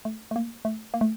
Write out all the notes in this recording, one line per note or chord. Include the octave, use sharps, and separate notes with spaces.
A3
A3
A#3
A3
A#3
A3